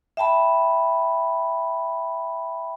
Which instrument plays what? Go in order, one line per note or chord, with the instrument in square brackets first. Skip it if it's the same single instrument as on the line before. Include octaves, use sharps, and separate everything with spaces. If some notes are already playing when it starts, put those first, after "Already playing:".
[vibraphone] E5 G5 A5 B5